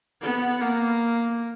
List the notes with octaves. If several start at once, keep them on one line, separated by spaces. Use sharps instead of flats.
B3
A#3